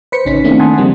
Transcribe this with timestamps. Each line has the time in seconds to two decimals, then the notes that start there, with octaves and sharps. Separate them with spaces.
0.12 B4 C5 B6 C#7
0.25 A1 C#3 C#4 D#4 B6
0.44 D#3 A3 A#3 C4 D4 E4
0.59 F#5 G#5 A5 C6 D#6
0.78 C#3 F3 G3 A#3 C4